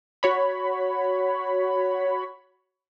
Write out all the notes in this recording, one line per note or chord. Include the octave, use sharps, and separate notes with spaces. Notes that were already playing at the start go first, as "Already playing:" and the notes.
F#4 C#5 B5